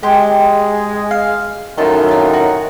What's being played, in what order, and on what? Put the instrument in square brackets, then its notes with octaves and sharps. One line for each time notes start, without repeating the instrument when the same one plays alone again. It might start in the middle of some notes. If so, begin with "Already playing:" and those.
[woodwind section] G#3 [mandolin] G4
[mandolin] F5
[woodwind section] F#2 A2 D#3 [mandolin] F4 A4
[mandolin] C4 F4
F#4